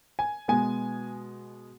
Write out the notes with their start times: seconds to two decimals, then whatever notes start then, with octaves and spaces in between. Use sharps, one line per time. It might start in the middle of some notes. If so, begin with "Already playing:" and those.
0.19 G#5
0.48 B2 G#3 B3 G#5